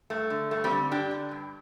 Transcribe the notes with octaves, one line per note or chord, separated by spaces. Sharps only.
G2 A3
D3
G2 A3
G3 C4
D3
G2 D4 G4
D3
G2